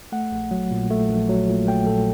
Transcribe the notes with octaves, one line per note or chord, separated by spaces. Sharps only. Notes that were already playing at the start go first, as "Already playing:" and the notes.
A3 F#5
A#1
F#3
A#2
A3
A#1
F#3
A#2
A3 G5
A#1 A4